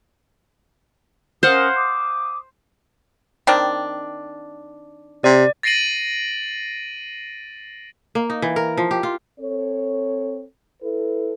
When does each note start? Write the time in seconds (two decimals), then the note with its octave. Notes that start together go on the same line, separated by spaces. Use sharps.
1.43 C#4 A#4 C5 F5 F#5 D#6
1.75 D6 D#6
3.47 D#3 C4 D4
5.24 C3 D5
5.63 A6 A#6 C7 D7 D#7 F#7
8.15 A#3
8.30 D#4
8.42 E3
8.56 A#4
8.77 F3
8.91 G4
9.03 F4
9.39 C4 A4 C#5
10.82 E4 A4 B4